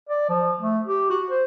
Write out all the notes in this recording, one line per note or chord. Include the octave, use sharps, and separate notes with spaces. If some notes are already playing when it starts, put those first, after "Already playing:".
D5
F3
A3
G4
F#4
C5